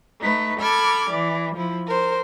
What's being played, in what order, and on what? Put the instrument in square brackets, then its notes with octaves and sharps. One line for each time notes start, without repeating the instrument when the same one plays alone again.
[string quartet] A3 D#4 B4
A4 B5 D6 F6 G#6
E3 D5
F3 E4
A#4 C5